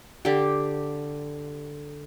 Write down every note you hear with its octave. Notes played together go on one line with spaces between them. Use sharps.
D3 G4